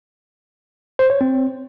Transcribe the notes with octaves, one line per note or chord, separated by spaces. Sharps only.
C5
C#5
C4